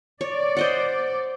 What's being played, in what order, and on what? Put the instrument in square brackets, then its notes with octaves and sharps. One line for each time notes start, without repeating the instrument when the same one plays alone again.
[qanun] C#5 [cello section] D5
[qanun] C5 D#5 F#5